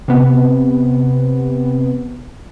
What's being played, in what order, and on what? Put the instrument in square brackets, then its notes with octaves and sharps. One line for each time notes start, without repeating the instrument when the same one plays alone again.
[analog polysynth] C3 B3